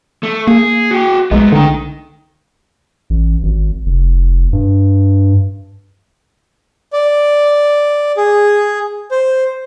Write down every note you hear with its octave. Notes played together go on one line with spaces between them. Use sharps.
A3
A#3 G#4
F#4 G5
B1 G#3 A3 B3
D3 D#4 G5
A1
G#1
F1
G2
D5
G#4
C5